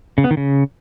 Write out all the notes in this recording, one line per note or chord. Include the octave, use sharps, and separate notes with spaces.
C#3
B3
D#3
C#3